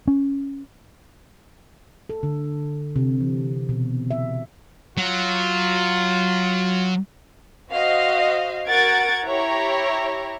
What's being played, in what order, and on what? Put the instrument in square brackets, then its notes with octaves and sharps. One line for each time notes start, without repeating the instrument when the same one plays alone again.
[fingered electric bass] C#4
[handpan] A4
D3
C3
E3
B2
E5
[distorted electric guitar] F#3 [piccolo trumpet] F4
[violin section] F#4 C5 D#5 F5
F#4 A#4 F#5 G#6 A6 D7
E4 G4 C#5 A#5